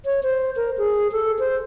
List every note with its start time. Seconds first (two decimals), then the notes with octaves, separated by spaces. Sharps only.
0.05 C#5
0.23 C5
0.56 A#4
0.78 G#4
1.12 A4
1.39 C5